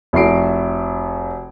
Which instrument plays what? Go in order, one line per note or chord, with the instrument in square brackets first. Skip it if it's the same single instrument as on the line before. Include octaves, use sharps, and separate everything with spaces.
[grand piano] F1 E4 F#4 C7 D7